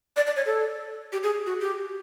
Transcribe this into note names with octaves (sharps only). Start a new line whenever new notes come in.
D5
D5
C#5
A4
G4
G#4
F#4
G4